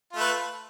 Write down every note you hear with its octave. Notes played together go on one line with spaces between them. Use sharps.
A3 F4 B4